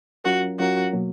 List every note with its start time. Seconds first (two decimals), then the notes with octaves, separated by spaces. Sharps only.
0.24 F#3 C#4 F4 F#4 A#4
0.59 F#3 C#4 F4 F#4 A#4
0.93 B2 F#3 A#3